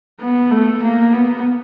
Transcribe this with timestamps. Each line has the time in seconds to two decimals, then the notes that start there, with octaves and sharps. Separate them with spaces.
0.20 B3
0.51 A3
0.83 A#3
1.13 B3